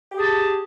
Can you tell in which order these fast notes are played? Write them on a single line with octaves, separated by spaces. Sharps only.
G4 G#4 A5